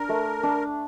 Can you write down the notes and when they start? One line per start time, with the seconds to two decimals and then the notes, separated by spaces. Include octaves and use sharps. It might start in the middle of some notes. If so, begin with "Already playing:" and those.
Already playing: D4 A#4
0.09 A3
0.43 D4